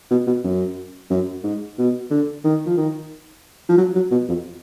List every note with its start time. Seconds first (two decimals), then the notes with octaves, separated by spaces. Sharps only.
0.11 B2
0.27 B2
0.44 F#2
1.10 F#2
1.44 G#2
1.78 B2
2.11 D3
2.44 D#3
2.66 F3
2.77 D#3
3.69 F3
3.77 F#3
3.95 F#3
4.11 B2
4.28 F2